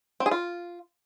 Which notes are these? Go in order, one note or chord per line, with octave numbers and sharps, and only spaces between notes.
C4
G#4
F4